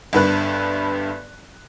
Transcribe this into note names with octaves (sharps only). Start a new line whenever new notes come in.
G1 G2 B4 F#6